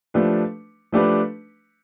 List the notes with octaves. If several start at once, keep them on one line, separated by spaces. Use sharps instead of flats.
F3 A3 D4 G4 B4
F3 A3 D4 G4 B4